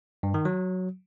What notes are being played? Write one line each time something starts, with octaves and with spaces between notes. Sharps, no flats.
G2
D#3
F#3